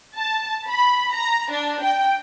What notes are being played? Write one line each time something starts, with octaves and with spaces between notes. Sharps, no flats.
A5
B5
A#5
D4
G5